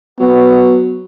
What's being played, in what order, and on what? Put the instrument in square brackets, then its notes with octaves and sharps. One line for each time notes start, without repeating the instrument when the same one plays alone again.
[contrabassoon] F#3 [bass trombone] B3